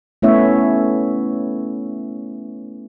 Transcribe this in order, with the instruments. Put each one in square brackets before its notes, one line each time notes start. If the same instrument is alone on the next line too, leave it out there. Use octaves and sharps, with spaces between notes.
[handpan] A3 B3 C#4 E4 C#5 E5